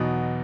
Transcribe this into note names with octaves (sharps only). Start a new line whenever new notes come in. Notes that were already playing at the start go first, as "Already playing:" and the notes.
Already playing: E2 B2 F#3 B3 D#4